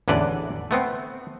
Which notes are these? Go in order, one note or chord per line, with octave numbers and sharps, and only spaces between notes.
A1 E2 D3 B4 D5
A3 B3 C4